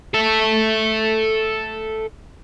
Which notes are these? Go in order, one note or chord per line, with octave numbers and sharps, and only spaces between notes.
A4 E5